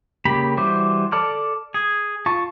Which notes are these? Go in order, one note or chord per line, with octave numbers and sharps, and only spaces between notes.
C#3 A#3 G4 B5
E3 G3 F#4 C5 D6
A4 D5 A5 D6 F6
G#4
F4 A5 C#6